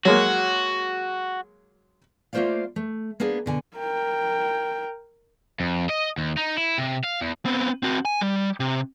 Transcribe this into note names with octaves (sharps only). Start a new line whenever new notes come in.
F#3 G#3 A#3 F#4
A3 A#3 F4 C5 D5 F5
A3
A#3 B3 D4 G#4
B2 D3 G#5
A#4 G5
F2
D#5
D#2
D#4
E4
C3
F5
E2
B3 C4
C4 F#4
G#5
G3
C3